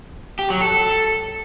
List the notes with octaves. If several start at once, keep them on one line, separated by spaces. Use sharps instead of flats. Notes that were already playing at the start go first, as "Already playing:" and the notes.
G4
F#3
A4